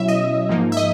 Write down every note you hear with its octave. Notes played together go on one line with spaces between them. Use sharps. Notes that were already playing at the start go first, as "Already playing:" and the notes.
Already playing: B2 F#3 C#4 E4 E5
D#5
G#2 F3 A#3 D#4
E5
D#5